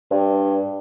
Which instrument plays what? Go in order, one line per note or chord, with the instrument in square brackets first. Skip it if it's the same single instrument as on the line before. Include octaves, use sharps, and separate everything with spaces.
[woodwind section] G2